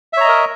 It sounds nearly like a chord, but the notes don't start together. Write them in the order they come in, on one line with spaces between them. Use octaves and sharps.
E5 C#5 A#5 D#5 A#4